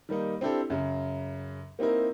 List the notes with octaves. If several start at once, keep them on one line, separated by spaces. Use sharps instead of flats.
D#3 G3 A#3 D#4
C4 D4 E4 G4 A4
F#2 C#3
A#3 C4 D#4 E4 A#4